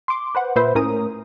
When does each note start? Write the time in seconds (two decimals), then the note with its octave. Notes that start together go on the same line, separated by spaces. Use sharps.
0.08 C6 D6
0.35 B4 C5 F#5
0.56 A#2 B4 C5 E5
0.75 A2 C#4 A#4 A#5 D#6